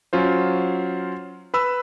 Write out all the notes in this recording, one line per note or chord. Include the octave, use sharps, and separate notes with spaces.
F#3 C#4 F4 C5
B4 B5 E6